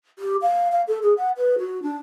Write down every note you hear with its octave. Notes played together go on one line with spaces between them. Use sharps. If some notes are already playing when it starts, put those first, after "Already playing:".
G4
F5
F5
A4
G#4
F#5
B4
F#4
D4